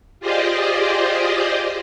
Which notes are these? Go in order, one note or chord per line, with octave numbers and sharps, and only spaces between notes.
F4 G4 G#4 C5 D5 D#5